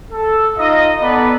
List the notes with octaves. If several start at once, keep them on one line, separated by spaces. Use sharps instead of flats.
A4
D#4 F4 D#5
B3 A4 B4 D5 A#5